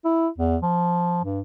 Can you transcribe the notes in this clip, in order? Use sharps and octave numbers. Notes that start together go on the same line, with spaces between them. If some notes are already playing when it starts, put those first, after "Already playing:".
E4
E2
F3
G2